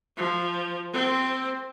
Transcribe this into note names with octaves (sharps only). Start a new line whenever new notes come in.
F3
C4